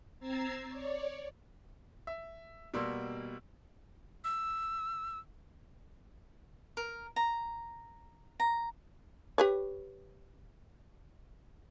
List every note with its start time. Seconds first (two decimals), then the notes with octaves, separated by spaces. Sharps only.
0.20 C4 A#5 E6 G#6 A6 C7
0.69 C#5 D5
2.07 E5
2.74 B2 G3 A#3 C6 E6
4.24 E6
6.77 A#4
7.16 A#5
8.40 A#5
9.38 G4 B4 C#5